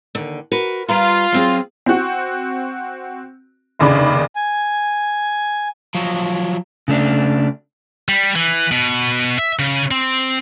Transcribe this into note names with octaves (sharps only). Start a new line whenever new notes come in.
D#2 D3
F#4 A#4 B4
G3 F4 B4 A#5
F#3 C4 G#4
C4 F#4
F1 D#2 C#3 D4 D5 B5
G#5
F3 F#3
C#3 A3 D4
G3
E3
B2
E5
C#3
C4